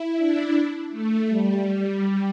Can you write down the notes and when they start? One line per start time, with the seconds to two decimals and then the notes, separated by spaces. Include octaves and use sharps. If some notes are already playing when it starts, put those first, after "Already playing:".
Already playing: E4
0.17 D4
0.91 A3
1.29 G3